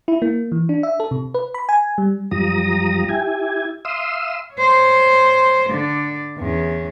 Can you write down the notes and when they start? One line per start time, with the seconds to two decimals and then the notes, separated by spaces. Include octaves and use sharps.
0.08 E4
0.22 A#3
0.52 E3
0.69 D4
0.83 E5
1.00 A4
1.11 C3
1.34 B4
1.54 B5
1.69 G#5
1.98 G3
2.31 F#2 F3 G3 A#5 D#6
3.09 E4 G4 G#5
3.85 E5 F5 C6 D#6 E6
4.55 C5 C#5
5.69 D3 D5
6.38 E2 C#4